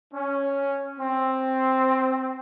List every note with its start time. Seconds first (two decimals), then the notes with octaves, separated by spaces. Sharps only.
0.13 C#4
1.00 C4